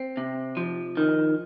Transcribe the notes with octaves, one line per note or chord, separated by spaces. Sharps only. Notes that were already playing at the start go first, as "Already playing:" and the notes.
Already playing: C4
C3
F3
D#3